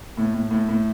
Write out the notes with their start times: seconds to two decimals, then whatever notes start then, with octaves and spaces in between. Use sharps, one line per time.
0.17 A2
0.34 A2
0.51 A2
0.69 A2